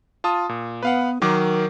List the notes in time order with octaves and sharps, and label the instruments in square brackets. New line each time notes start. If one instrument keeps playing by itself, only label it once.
[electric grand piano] F4 A5 D#6
A#2
[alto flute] B3 [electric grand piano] B4 F5 F#5
[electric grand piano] D#3 F#3 D6 [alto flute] A#4